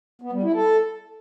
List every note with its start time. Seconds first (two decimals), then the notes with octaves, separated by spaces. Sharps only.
0.22 B3
0.32 G3
0.43 E4
0.54 A4